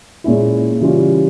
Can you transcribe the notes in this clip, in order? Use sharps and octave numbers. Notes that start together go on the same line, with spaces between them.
A#2 G#3 C#4 E4
C#3 E3 G3 C#4 F4